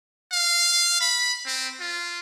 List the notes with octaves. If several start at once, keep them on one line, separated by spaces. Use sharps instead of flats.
F5
B5
C4
F4